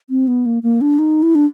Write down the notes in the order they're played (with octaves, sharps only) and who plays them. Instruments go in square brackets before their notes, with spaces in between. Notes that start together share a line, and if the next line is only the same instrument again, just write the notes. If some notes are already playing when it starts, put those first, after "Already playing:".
[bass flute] C4
B3
A#3
A#3
D4
D#4
E4
D4